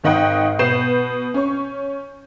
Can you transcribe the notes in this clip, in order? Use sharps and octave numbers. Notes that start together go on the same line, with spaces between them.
G#1 D#3 D#5 F#5 G5
B2 B3 G6 C7 E7
C#4 C#6